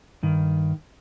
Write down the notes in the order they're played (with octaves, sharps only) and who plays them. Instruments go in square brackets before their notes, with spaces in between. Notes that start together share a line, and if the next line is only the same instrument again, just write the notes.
[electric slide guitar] G2 D#3